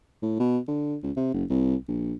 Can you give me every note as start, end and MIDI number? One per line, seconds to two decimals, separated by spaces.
0.23 0.36 45
0.40 0.58 47
0.68 0.97 50
1.03 1.11 37
1.16 1.29 48
1.34 1.44 30
1.50 1.75 36
1.88 2.14 34